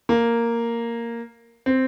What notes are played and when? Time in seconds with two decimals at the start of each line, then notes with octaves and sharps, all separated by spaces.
0.09 A#3
1.66 C4